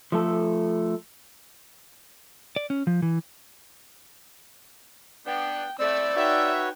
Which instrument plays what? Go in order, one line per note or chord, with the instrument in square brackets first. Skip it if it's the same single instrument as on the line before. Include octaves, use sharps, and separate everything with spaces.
[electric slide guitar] F3 A3 A4
[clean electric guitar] D5
C#4
F3
E3
[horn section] B3 D4 [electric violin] G5
[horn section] A3 C4 E4 [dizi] D5 [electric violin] E5 E6
[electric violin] D#4 G5 [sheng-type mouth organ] F#4 B4 C#5 [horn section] E5